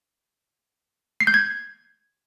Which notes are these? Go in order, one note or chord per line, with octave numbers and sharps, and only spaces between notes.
C7
G6
G#6